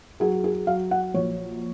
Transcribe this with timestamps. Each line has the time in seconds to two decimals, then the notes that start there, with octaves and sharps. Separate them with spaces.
0.20 F#3 G#4
0.44 G#4
0.67 F#3 F5
0.91 F#5
1.14 A#1 C#5